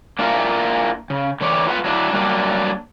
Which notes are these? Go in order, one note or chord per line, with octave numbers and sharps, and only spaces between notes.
A#3 D4 E4 F4 A#4
C#3
D3 E3 C#5 D5
F4 B4 F5 F#5
F#3 D4 E4
F#3 G3 A#3 D4